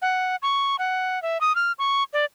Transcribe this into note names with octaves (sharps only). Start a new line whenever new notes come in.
F#5
C#6
F#5
E5
D#6
F6
C#6
D5